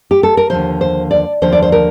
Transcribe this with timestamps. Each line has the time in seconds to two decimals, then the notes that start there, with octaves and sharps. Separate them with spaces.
0.11 G4
0.23 A4
0.37 A#4
0.50 D#2 D3 F3 C5
0.81 C5
1.11 D5
1.42 D#2 D3 F3 C5
1.53 D5
1.62 C5
1.72 A#4